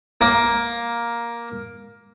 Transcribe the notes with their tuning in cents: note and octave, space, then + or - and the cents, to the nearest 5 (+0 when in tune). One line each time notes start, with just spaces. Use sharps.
A#3 +10